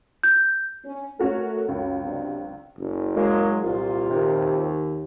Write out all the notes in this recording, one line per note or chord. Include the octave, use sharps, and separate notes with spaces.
G6
C#4
A3 C#4 F#4 A#4
C#2 F#2
F#2 C3 D4
F#1
F#3 G#3 A#3
C2 A#2 F4
D#2 C3